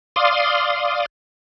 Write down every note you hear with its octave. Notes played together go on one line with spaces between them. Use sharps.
D5 F5 C6 D#6